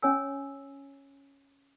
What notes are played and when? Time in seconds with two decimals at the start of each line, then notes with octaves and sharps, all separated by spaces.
0.02 C#4 C#5 G#5 E6